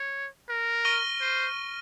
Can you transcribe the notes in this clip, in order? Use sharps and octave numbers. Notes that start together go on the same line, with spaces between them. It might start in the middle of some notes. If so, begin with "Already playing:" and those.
Already playing: C#5
A#4
C#6 F6 A#6 D#7 G7
C5